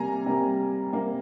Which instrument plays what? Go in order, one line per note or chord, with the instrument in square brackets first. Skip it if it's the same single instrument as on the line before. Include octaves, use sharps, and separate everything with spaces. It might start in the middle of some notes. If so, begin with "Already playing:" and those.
Already playing: [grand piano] C3 G3 A#3 G#5 A#5
C3 G3 A#3
C3 G3 A#3